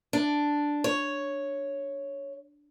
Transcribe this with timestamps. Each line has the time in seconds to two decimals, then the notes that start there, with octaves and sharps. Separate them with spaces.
0.13 D4
0.84 C#5